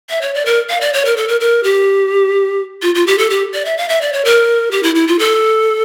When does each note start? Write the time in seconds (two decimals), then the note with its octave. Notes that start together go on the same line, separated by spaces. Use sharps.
0.10 E5
0.22 C#5
0.34 D5
0.46 A#4
0.70 F5
0.81 D5
0.93 C#5
1.05 A#4
1.17 A4
1.28 A#4
1.40 A#4
1.64 G4
2.82 F4
2.95 F4
3.07 G4
3.18 A4
3.30 G4
3.54 D5
3.65 E5
3.77 F5
3.89 E5
4.01 D5
4.13 C#5
4.25 A#4
4.71 G4
4.83 E4
4.95 E4
5.07 F4
5.19 A4